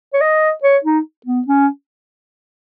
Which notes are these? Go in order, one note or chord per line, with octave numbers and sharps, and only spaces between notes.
C#5
D#5
C#5
D#4
B3
C#4